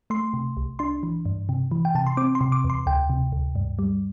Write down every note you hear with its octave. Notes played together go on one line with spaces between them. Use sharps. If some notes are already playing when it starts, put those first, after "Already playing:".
A3 C6
C3
C2
D4 C6
E3
G2
C3
E3
G5
C3 A5
C6
C4 D6
C6
C3
D6
E2
C6
D2 G5
C3
D2
G2
G3